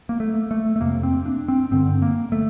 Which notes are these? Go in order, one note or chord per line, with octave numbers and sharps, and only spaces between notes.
A#3
A3
A3
A3
F2 C3 A#3
C4
D4
C4
G2 D3 C4
A#3
A3